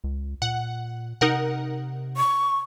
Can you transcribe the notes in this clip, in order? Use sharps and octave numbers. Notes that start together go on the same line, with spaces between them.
C#2
A#2 F#5
C3 D#4 A#4 F#5
C#6